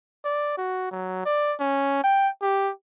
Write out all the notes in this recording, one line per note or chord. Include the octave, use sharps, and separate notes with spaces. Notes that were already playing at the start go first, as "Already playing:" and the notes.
D5
F#4
F#3
D5
C#4
G5
G4